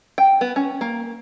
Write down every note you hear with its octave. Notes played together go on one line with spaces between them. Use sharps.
G5
B3
C#4
A#3